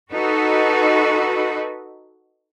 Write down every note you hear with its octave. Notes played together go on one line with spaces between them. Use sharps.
D#4 F#4 A4 B4